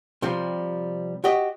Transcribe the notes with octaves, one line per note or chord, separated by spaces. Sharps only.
C3 F3 G3
F#4 G4 D#5